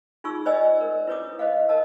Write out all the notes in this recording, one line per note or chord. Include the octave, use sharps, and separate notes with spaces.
D#4 F4 G#4 C#6 E6
C5 D5 D#5 G#5 E6
A#4
E4 B4 C#5 D6 D#6
C5 D#5 F5
A#4 D#5 A5 E6